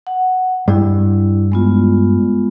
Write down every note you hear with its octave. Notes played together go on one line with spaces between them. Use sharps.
F#5
G2 E4
G#3 B3 F4